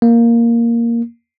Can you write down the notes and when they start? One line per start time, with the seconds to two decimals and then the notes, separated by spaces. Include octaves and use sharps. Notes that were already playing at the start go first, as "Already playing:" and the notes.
0.02 A#3